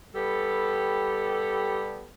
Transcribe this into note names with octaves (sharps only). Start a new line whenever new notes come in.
G3 B3 G4 A4